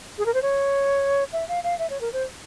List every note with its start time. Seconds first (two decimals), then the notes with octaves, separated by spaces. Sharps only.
0.18 G#4
0.26 A#4
0.34 C5
0.42 C#5
1.33 E5
1.48 F5
1.63 F5
1.79 E5
1.90 C#5
2.01 A#4
2.13 C5